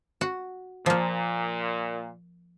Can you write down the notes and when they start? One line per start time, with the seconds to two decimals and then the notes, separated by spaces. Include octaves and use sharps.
0.21 F#4
0.86 A#2 F3 A#3